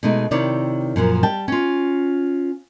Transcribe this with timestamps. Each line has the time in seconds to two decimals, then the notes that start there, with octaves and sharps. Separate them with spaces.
0.03 B2 G#3 A3 D#4
0.31 C3 D#3 E4 C#5 D5
0.96 F#2 A#2 E3 F3
1.23 G3 G5 A5
1.48 C#4 F4